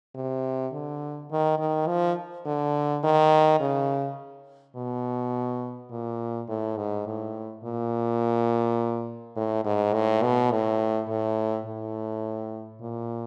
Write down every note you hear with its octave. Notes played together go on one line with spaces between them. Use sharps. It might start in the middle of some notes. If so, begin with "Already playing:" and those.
C3
D3
D#3
D#3
F3
D3
D#3
C#3
B2
A#2
A2
G#2
A2
A#2
A2
G#2
A2
B2
A2
A2
A2
A#2